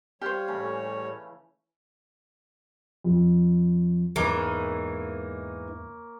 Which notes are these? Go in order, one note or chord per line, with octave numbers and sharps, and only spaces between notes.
G3 G4 C5 C#5 F5
A2 C#3 E3 A3
F2
E2 G#2 C#3 E3 G#3 A#3 D#4 C#5